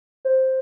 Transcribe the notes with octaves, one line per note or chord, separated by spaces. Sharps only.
C5